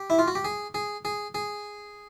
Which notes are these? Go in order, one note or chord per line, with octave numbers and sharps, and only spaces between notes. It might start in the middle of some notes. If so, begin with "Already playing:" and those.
Already playing: G4
E4
F4
F#4
G4
G#4
G#4
G#4
G#4